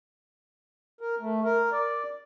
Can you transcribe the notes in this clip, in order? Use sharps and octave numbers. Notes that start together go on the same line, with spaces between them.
A#4
A3
A#4
D5